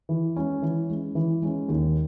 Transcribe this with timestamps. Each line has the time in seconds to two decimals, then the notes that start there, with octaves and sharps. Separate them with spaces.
0.09 E3
0.36 G#3 C#4
0.62 E3
0.90 G#3 C#4
1.15 E3
1.42 G#3 C#4
1.68 D#2